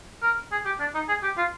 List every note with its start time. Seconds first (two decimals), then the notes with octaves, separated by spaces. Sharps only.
0.22 A#4
0.52 G#4
0.65 G4
0.80 D4
0.94 D#4
1.08 G#4
1.23 G4
1.37 F4